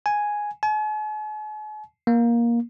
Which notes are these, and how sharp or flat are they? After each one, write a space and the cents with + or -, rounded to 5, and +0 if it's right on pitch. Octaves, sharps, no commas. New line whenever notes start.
G#5 +0
G#5 +45
A#3 +15